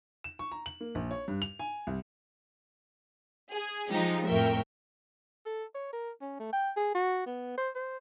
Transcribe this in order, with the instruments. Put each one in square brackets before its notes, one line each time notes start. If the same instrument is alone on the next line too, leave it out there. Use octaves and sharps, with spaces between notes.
[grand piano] E7
C#6
A#5
F#7
A#3
A#1
C#5
G2
F7
G#5
C2
[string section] G#4
F3 G#3 D#4 G4
F2 A2 A#4 E5 G5 C#6
[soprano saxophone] A4
C#5
A#4
C#4
A3
G5
G#4
F#4
B3
C5
C5